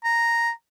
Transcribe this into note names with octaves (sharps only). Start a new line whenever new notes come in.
A#5